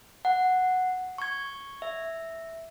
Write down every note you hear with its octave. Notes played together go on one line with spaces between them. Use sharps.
F#5
C#6 G#6
E5